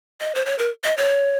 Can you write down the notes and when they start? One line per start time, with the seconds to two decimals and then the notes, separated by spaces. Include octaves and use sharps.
0.21 D#5
0.35 C5
0.45 C#5
0.58 A#4
0.84 D#5
0.97 C#5